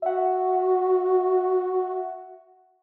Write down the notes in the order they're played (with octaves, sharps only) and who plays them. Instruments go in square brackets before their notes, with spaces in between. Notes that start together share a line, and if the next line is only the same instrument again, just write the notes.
[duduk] F#4 [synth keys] E5 F#5